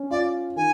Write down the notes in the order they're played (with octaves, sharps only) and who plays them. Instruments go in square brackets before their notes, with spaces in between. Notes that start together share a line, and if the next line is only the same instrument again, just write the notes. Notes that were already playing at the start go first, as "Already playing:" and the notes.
Already playing: [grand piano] C#4
[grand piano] F4 [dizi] D5
[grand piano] D#3 [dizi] G#5